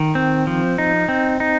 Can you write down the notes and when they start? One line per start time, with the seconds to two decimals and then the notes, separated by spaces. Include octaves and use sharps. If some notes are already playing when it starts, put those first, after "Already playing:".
Already playing: D#3
0.15 C4
0.47 F3
0.78 D#4
1.09 C4
1.40 D#4